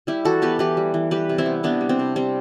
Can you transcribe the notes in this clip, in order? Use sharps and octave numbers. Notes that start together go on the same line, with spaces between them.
G3 E4 G4
E3 F#4 A4
B3 G4 B4
E3 G4 B4
G3
E3
G3 G4 B4
C3
C4 E4
B3
C3 B3 D4
G3
C4
C3
G3 C4